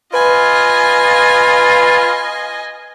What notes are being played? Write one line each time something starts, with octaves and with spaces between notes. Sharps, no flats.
F4 B4 D#5 G#5